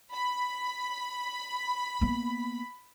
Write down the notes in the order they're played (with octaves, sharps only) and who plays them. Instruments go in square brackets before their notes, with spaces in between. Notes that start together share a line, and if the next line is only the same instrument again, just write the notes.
[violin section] B5
[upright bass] A#3 B3